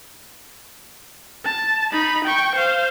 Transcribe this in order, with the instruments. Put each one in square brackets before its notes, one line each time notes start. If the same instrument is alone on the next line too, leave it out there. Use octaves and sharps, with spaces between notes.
[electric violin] A5
D#4 B5
G5 C#6
C5 F5